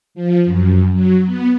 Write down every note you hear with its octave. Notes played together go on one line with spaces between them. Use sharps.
F3
F#2
F#3
B3